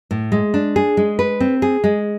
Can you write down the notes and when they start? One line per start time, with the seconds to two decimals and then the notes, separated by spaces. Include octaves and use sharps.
0.11 A2
0.32 G#3
0.54 D4
0.76 G#4
0.97 G#3
1.19 B4
1.40 C4
1.62 G#4
1.84 G#3